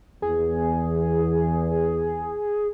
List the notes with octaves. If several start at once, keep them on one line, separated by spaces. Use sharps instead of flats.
E2 G#4